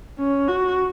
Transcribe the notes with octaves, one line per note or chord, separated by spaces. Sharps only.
C#4
F#4